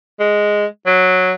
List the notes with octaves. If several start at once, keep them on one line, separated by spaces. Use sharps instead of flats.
G#3
F#3